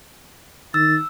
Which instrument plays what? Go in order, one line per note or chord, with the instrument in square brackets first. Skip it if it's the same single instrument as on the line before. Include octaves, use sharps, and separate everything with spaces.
[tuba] D#3 [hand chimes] E6 [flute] A6